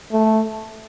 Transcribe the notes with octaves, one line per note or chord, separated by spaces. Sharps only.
A3